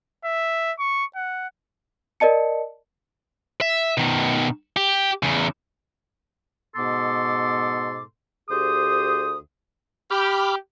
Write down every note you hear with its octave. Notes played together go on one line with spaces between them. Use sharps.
E5
C#6
F#5
A#4 D5 D#5 A5 C#7
E5
B2 D#3
G4
E2 C#3
G#2 B2 B3 A4 C6 D6
D2 G4 G#4 C5 D#6
G4 B5 D6 F6